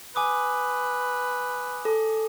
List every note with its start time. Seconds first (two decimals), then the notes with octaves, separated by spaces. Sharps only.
0.16 B4 G#5 D6 D#6
1.85 A4